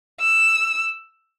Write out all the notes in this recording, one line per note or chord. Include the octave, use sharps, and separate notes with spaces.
E6